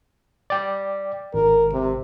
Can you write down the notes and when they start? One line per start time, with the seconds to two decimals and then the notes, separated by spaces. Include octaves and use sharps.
0.50 D5 G5
1.34 G#1 A#4
1.73 C3